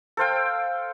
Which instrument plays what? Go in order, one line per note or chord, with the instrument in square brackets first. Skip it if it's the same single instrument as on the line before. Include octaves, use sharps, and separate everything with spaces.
[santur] A4 C5 F5 G5